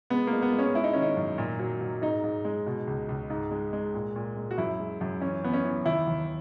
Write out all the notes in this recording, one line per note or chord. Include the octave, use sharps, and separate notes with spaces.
G#3 B3
A#3
G#3
B3
G#3
C#4
G#3 E4
D#4
D#3 C#4
D#4
F#2
A#2
F#3
F#3
G#2 D#4
G#2
G#3
B2
C#2
C#2
G#2
G#3
G#3
A#2
A#2
G#3
F#4
F#2 E4
G#3
F#2
E3 C#4
E3 B3
C#4
E3
D#2 E4
D#2